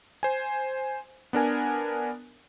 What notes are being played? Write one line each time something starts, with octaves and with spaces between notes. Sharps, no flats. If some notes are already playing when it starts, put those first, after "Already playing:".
C5 G#5
B3 D4 A#4 G#5